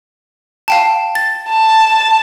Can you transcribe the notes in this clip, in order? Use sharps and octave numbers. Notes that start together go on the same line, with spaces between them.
F5 G5 A5
A6
A5